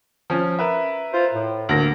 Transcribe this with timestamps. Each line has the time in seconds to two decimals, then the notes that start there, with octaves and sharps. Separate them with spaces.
0.30 F3 C#4
0.59 A#4 B4 E5
1.13 F4 C5
1.33 A2
1.69 D2 A#3 A#6